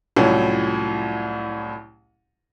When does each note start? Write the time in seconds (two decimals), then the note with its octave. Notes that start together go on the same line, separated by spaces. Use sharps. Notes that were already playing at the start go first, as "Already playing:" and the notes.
0.16 C2 A2 F3 F#3 C#4